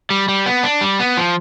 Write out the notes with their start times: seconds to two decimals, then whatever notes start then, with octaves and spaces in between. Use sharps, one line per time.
0.10 G3
0.29 G3
0.46 B3
0.63 D4
0.81 G3
1.00 B3
1.17 F3